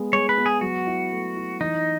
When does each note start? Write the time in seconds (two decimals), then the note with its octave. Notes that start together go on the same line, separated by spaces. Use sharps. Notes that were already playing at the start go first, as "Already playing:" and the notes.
Already playing: G#3 B3
0.13 G#3 C#5
0.29 B4
0.38 B3
0.46 G#4
0.61 F#3 F#4
0.87 E4
1.12 A3
1.36 E4
1.60 E3 D#4